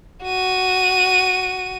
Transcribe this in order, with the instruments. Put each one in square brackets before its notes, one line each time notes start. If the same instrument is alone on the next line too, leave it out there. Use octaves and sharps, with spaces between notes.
[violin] F#4 D#7